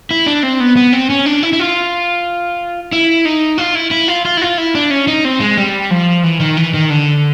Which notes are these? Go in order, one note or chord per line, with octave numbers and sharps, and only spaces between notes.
E4
D4
C4
B3
B3
C4
C#4
D4
E4
E4
F4
E4
D#4
F4
E4
E4
F4
F4
E4
F4
E4
D4
C#4
D#4
C4
G#3
G3
F3
E3
D#3
E3
D#3
D3